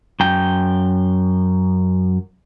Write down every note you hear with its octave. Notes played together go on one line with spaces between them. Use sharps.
F#2 G5